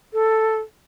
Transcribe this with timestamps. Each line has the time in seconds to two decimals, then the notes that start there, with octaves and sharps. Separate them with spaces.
0.13 A4